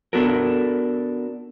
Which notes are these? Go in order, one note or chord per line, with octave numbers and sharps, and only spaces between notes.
B3 D4 F#4 A4 A#4